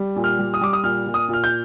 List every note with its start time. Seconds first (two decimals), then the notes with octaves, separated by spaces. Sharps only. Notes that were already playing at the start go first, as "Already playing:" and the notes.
Already playing: G3
0.16 A#2
0.24 F6
0.39 G3
0.54 D#6
0.61 G3 D6
0.73 D#6
0.84 A#2 F6
1.06 A#2
1.14 D#6
1.29 A#2 F6
1.44 G6